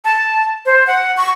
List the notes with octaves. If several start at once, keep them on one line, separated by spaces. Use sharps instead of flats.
A5
C5
F#5
C#6